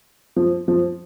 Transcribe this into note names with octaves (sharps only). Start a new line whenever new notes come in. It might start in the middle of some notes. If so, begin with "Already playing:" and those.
F3
F3